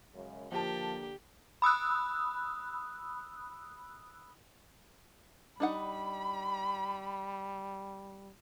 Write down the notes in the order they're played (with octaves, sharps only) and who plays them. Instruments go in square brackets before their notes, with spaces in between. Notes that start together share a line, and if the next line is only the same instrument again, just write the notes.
[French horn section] F#2 C#3 G#3
[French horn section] D3 A#3 [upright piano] F3 A5 [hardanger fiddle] G4
[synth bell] B5 D#6 E6 F#6
[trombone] G3 [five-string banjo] D4 D#4 F#5 [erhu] B5